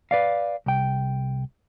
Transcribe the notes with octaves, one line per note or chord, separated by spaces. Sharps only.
B4 D5 F5
C2 G5